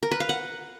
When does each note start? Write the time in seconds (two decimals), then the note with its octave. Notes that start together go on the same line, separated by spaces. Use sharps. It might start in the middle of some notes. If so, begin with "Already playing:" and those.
0.03 A#4
0.11 B4
0.20 F5
0.29 F#5